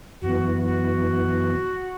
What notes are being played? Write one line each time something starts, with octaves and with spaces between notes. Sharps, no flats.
F#2 E3 B3 F#4
F#4